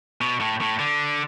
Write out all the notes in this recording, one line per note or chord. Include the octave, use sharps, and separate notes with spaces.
B2
A2
A2
D3